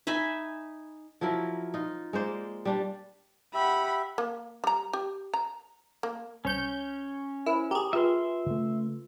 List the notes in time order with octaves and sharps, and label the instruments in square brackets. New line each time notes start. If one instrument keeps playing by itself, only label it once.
[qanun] D#4 E5 G#5 B5
[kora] F3 F#3 E4 A#4
D#4 F4
G#3 A#3 C5 D5
G3 D4 C5
[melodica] G4 E5 [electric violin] F#5 B5
[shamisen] A#3
G3 A#5
G4
A#5
A#3
[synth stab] C2 G6 [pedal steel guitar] C#4 C#5
[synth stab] E4 [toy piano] A#4 C5
[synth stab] G4 G#4 [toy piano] A#5 C6
[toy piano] F4 B4 [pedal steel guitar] E5 C6
[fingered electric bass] C#3 A3